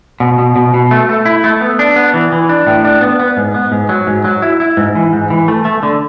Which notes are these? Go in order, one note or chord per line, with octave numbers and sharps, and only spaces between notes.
B2
B2
B2
B2
A3
A3
E4
A3
B3
D4
B3
E3
E3
D4
A2
D4
B3
B3
G#2
B3
G#2
F#3
G#2
F#3
E4
E4
G#2
E3
G#2
E3
A3
A3
D3